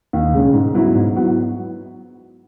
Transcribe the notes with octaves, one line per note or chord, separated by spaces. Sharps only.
D#2
C#3 G#3 C#4 G#4
G#2
F#3 B3 E4
G#2
F#3 B3 E4